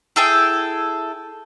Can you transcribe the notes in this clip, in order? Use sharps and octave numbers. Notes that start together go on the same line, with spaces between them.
E4 G#4 A4 G5